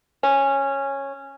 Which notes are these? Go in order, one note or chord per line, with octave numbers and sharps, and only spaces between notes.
C#4